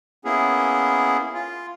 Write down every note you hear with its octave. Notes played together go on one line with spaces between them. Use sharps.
A#3 B3 C#4 E4 G#4
F4